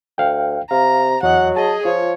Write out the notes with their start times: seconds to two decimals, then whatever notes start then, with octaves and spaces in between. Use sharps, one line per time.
0.18 D2 F5 G5
0.71 C3 F5 A#5
1.23 E2 F#3 D#5 F#5
1.56 G#4 D#5 A5
1.85 F3 F4 C#5